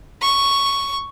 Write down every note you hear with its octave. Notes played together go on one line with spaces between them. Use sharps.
C#6